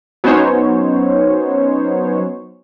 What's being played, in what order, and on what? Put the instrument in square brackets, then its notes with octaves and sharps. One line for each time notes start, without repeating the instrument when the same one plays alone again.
[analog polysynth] F#3 B3 C#4 D#4 C5 C#5